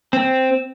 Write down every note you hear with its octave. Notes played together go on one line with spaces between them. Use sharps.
C4